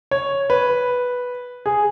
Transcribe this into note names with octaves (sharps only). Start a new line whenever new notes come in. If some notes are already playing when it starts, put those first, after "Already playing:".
C#5
B4
G#4